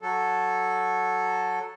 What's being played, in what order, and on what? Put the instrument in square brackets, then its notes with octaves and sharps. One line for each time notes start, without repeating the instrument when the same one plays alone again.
[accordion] F#3 A4